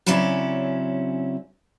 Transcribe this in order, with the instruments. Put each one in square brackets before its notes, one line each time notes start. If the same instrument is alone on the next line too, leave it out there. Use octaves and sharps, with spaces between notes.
[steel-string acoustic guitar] C#3 F#3 C4 C#4 E4 D5